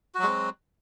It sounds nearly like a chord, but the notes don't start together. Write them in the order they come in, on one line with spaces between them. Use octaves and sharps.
F#4 F#3 G#3 C4